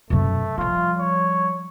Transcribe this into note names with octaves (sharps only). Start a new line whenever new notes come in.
F#2 B2 A3
F3 G3 F4
C#5